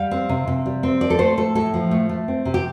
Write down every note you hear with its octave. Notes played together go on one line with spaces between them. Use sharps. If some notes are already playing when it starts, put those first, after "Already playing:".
Already playing: G3 F5
C4
C3
C3
G3
C4
F3 D5
A4
A3 C5
A2 A4
A2 A4
F3
A3
A3
C4
C3
G4